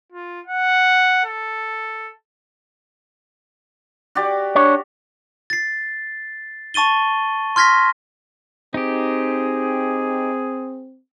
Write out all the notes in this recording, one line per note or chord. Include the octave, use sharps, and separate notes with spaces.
F4
F#5
A4
F#4 G4 D5
D4 C#5
A6 C7
A5 C#6 A6 D#7 G7
C6 F6 G#6 A#6 B6
C4 D#4 G4 G#4